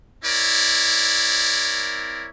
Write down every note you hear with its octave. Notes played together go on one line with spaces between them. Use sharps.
C4 E4 A#4 C#5 D5